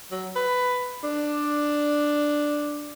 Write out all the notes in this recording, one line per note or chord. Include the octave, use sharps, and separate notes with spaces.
F#3
B4
D4